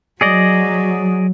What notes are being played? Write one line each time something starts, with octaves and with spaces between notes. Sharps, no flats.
F#3 G#4 D5 D#5